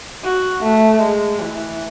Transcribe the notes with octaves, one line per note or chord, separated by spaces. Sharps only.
F#4
A3
G#3
E3